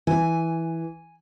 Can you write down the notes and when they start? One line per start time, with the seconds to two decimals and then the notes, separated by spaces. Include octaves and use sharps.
0.07 E3 G#5